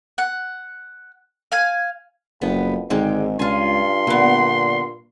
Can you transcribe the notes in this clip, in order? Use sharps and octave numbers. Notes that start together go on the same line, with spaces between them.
F#5
F5 G#5
F#1 F2 B3
G#1 G#2 D3 G#3 G5
C#2 G2 F4 G#5 C6
A#2 D3 B3